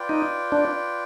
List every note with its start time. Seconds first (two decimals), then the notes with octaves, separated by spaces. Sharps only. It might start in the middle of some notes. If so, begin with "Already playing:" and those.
Already playing: F4 B4 D5 G5
0.09 D#4
0.52 D4